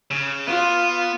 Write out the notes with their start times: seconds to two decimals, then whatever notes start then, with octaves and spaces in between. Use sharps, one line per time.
0.11 C#3
0.47 B3 F4